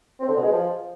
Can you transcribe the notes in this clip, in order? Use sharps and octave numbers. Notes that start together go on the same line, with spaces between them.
C4
D3
B2
G#3
F3